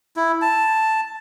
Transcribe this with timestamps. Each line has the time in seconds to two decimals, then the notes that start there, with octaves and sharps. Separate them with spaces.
0.16 E4
0.42 A5